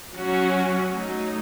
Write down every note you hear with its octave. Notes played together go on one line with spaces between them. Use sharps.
F#3 C#4 F#4
F#3 A3 D#4